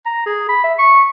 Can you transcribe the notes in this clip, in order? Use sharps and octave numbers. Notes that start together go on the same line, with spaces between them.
A#5
G#4
B5
E5
C#6